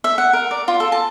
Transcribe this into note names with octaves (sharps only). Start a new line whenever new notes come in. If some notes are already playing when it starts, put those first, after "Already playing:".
E5
F#5
A#4
D5
F4
A4
A5